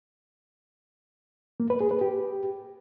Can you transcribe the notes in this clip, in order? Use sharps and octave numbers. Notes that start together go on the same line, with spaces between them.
A#3
B4
G#4
B4
G4